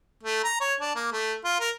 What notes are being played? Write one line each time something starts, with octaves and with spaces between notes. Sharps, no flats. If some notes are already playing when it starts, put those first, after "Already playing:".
A3
A#5
C#5
D4
A#3
A3
F4
A#4